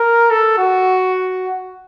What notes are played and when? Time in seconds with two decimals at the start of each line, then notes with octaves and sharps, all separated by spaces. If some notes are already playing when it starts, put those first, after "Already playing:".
Already playing: A#4
0.30 A4
0.58 F#4